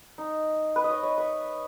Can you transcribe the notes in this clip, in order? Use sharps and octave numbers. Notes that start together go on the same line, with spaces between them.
D#4
B4
D#5
C#5
C#5
B4